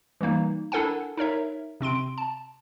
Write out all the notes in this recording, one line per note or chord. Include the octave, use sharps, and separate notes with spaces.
E3 G3 A#3 D#4
D4 E4 A4 A#4 F#5 G#5
D#4 A#4 C#5 E5
C3 C4 C6 D7
A5